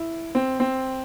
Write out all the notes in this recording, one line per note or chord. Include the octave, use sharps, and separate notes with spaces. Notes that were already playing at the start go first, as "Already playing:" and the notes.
Already playing: E4
C4
C4